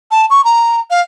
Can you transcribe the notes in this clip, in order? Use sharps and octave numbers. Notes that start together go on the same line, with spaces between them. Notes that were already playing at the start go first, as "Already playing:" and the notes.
A5
C#6
A#5
F5